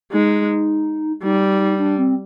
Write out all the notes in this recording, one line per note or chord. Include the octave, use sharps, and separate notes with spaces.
G#3 D#4
G3 D#4
D4
C4